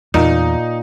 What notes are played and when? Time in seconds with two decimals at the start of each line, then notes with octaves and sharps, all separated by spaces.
0.14 E2 A#2 D#4